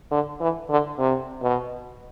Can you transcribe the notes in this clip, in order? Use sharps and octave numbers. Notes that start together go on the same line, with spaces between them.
D3
E3
D3
C3
B2